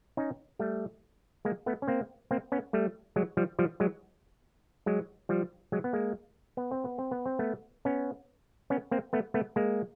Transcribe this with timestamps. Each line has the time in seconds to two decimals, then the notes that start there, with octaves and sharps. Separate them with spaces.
0.17 C#4 D#4
0.59 G3 A3
1.45 G#3 A#3
1.66 A3 B3
1.82 C#4
1.88 A#3 C4
2.31 A#3 C4
2.52 B3 C#4
2.73 G3 A3
3.16 F#3 G#3
3.37 F3 G3
3.59 F3 G3
3.80 F#3 G#3
4.86 F#3 G#3
5.29 F3 G3
5.72 F#3 G#3
5.84 B3
5.93 G#3 A#3
6.57 B3
6.71 C4
6.84 B3
6.98 C4
7.11 B3
7.26 C4
7.39 A3 B3
7.85 B3 C#4
8.70 B3 C#4
8.91 A#3 C4
9.13 A3 B3
9.34 A3 B3
9.56 G#3 A#3